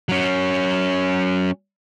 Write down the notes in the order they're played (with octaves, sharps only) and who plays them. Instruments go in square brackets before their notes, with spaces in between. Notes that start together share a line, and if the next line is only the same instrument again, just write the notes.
[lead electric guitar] F#3 C#4